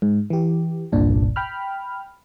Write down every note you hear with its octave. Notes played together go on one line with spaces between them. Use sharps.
G#2
E3 G4
G1 C2 G2 A#2 D4
G5 B5 F6